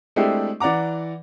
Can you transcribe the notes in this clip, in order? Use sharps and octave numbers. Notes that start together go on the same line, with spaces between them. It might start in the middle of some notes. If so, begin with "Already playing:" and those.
G#3 A3 C4 D4 E4 G4
E3 D5 F#5 A#5 D6